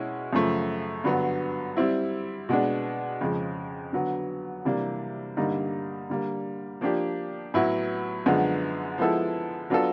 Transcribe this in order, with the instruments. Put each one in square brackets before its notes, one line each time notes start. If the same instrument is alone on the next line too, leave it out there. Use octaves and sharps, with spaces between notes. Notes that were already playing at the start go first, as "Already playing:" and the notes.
Already playing: [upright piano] B2 G#3 C#4 E4
F#2 C#3 F3 A3
G2 D3 F#3 B3
G3 C4 E4
B2 G#3 B3 D4
F2 C#3 F3 G#3
D3 F#3 B3
C3 E3 G3 A#3 D4
G2 D3 G3 A#3 D#4
D3 G3 A#3
F3 A#3 D4 G4
A2 F#3 B3 E4
F#2 D3 F3 G#3 B3
F3 G#3 B3 E4 A4
F#3 B3 D4 F4 A4